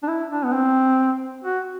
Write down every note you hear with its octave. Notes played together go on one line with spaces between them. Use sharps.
D4
E4
D4
B3
C4
F#4